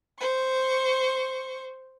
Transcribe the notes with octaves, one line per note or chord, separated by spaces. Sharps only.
C5 C#6